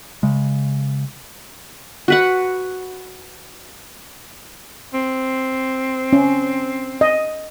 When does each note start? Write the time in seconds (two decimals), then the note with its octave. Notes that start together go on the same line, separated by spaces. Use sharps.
0.23 C#3 G#3
2.08 F#4 B4 F#5
4.94 C4
6.13 C#4
7.01 D#5